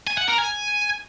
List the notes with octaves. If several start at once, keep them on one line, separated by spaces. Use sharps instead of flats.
G#5
F#5
A#4
G#5